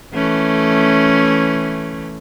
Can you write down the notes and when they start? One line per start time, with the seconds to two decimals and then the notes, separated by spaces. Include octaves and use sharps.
0.13 E3 A3 C#4